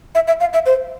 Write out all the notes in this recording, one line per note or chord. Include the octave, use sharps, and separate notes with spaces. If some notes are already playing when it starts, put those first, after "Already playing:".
E5
E5
F5
E5
C5